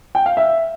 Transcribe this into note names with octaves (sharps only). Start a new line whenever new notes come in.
G5
F5
E5